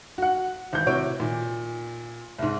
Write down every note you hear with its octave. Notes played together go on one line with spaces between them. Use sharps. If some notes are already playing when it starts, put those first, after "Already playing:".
F#4 F#5
G#1 E3 G6
A2 C3 F#4 C#5 C#6 D7
A#2 D#3
C2 G#2